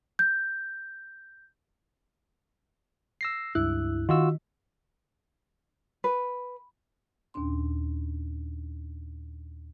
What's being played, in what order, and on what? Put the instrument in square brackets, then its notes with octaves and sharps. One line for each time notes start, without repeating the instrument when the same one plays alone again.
[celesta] G6
[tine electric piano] E6 A#6 C7
[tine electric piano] C#2 G2 F#6 [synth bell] E4
[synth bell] D#3 [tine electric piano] F4 F#4 E6
[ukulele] B4
[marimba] D#2 A#2 C#4 D4 C6